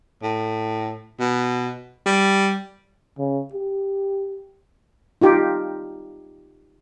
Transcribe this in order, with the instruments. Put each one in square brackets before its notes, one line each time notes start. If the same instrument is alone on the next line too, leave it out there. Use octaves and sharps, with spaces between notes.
[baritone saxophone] A2
B2
G3
[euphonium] C#3
G4
[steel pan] D#4 F4 G4